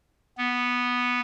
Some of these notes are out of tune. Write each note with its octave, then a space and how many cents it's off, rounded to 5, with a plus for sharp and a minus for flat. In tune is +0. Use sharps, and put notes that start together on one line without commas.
B3 -5